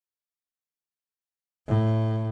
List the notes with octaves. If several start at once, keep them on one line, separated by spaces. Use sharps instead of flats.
A2